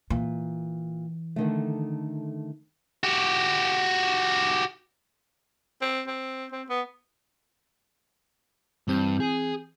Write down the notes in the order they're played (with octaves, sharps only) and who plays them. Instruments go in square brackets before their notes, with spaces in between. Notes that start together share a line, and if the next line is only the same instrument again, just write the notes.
[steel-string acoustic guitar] A#2 [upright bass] E3
[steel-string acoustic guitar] D3 D#3 A3
[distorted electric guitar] F#4 G4
[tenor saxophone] C4
C4
C4
B3
[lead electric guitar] G2 [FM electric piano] E3 C4 G6
[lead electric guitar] G#4